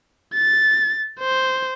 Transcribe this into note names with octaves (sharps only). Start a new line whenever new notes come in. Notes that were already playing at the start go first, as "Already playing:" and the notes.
A6
C5